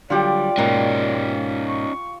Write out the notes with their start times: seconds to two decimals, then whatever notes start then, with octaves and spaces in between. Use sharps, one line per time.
0.10 D3 F#3 G3 F4 G4 D5
0.58 G#2 B2 A#3 C#4 D#4
1.68 C#6